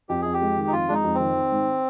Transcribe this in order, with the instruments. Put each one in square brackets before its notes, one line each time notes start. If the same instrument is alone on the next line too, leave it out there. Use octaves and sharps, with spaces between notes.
[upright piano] F2 [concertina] G4
[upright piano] F2 [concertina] G#4
[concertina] G4
[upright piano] G#3
D#3
[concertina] D#4
[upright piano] F2 [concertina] F4
[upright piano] G#3 [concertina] D4
[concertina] D#4
[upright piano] F2
[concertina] C4
[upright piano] D#3
D#3
G#2